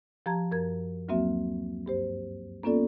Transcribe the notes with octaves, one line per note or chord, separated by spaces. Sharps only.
F3 G4 A5 A#5 G#6
F#2 A#4 G#6
D2 F#3 A#3 C4 F#4 E5
G2 G4 C5
A#3 B3 C#4 F4 A4 D5